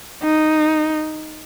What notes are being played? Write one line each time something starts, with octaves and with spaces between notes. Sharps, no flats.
D#4